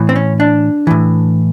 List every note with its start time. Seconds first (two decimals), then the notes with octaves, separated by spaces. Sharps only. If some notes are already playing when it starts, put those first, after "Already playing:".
Already playing: A2 E3
0.09 C4
0.16 C#4
0.40 D4
0.87 A2 E3